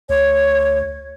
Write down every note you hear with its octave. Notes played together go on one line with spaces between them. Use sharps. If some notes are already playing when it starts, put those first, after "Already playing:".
D2 C#5